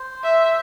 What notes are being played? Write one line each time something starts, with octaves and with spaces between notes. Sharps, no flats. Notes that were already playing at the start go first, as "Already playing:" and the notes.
Already playing: C5
E5